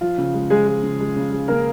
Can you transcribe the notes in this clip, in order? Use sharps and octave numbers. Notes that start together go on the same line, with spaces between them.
F3 F4
C#3
G#3
F3 G#3 G#4
G#3
C#3
G#3
C#3
G#3
C#3 A#3 A#4